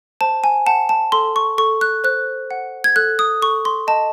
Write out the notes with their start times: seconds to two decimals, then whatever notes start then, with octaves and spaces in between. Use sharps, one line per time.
0.21 C5 A5
0.44 G#5
0.66 F#5 A5
0.89 A5
1.12 A4 C6
1.36 C#6
1.58 A4 C#6
1.81 F#6
2.04 C5 F#6
2.51 F#5
2.84 G#6
2.96 A4 F#6
3.19 D#6
3.42 A4 C#6
3.65 C6
3.87 D#5 A5